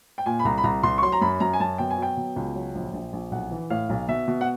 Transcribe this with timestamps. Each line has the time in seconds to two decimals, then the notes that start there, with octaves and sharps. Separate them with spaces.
0.18 G5
0.26 A#2 G#5
0.39 B5
0.45 C2 A#5
0.58 B5
0.64 C2 A#5
0.83 C2 C6
0.98 C#6
1.02 F#3 C6
1.12 A#5
1.21 F#2 B5
1.40 F#2 A#5
1.53 G#5
1.60 F#2 A5
1.78 B2 G5
1.90 G#5
1.98 F#3 G5
2.17 B2
2.36 C#2
2.55 F#3
2.75 A#1
2.94 A#1
3.13 A#1
3.31 B1 F#5
3.51 E3
3.70 A2 F5
3.89 B1
4.08 B2 E5
4.28 B2
4.41 F#5